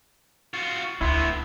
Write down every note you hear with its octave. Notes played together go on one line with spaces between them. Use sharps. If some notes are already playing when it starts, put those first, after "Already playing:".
F4 F#4
D2 A2 B3 E4 C6